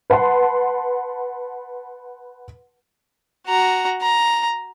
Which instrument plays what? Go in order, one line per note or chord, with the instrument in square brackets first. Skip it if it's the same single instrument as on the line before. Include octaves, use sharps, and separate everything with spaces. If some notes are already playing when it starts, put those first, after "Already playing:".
[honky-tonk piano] B4 F#5 A5 C6
[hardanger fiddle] F#4 A#5
A#5